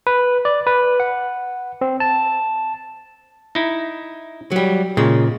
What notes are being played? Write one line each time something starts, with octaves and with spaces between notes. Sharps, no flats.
B4
D5
B4
F#5
C4
A5
D#4 E4
F#3 G3
A#2 C#3 G#3